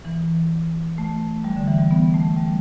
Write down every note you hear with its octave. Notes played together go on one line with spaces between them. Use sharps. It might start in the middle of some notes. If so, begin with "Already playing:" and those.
E3
A3
G3
D3
E3
G3
B3
A3
G3